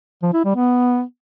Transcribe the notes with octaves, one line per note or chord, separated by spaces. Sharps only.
F3
E4
G3
B3